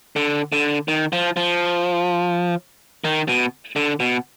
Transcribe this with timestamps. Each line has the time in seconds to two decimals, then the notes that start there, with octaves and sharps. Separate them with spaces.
0.16 D3
0.52 D3
0.88 D#3
1.13 F3
1.37 F3
3.04 D#3
3.28 B2
3.76 D3
4.00 B2